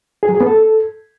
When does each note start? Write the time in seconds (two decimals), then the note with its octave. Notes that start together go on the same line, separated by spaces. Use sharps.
0.23 G#4
0.29 F#3
0.35 G#4
0.40 B3
0.46 A4